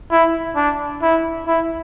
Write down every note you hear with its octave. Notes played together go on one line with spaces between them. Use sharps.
E4
D4
E4
E4